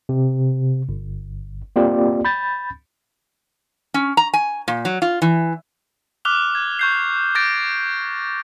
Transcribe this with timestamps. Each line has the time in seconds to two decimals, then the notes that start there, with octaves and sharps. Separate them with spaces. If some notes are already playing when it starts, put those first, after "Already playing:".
0.09 C3
0.89 G1
1.76 A#3 C4 F4 G4 D5
2.25 B5 G6 A6
3.94 C#4
4.17 A#5
4.34 G#5
4.68 A#2
4.85 F#3
5.02 F4
5.22 E3
6.25 D6 F6 F#6 F7 G7
6.55 G#6
6.79 C#6 G6 C7
7.35 D6 G6 A6 A#6 D7